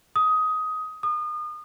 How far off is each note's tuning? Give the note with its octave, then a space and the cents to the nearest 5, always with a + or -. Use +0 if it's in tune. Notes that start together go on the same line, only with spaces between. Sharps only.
D#6 +15
D#6 -35